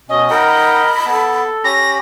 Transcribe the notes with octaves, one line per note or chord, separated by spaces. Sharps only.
B2 C#4 D#5
D#4 A#4 F#5 G5 B5
B3 A4 A5
C#4 G4 B5 A#6